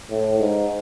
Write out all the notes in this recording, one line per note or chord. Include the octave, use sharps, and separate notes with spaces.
A2
G#2